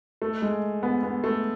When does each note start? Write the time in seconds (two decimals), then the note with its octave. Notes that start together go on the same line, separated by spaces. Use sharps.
0.22 A3
0.42 G#3
0.83 B3
1.03 B3
1.24 A3